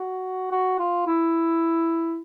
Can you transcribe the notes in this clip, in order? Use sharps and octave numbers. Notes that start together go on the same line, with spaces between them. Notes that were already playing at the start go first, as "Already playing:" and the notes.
Already playing: F#4
F#4
F4
E4